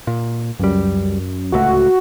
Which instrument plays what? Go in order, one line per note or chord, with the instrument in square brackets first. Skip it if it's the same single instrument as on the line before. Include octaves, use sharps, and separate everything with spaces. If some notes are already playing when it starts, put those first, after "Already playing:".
[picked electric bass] A#2
[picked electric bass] C#2 G3 [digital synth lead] F#2
[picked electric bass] D1 C#2 A3 [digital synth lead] F#4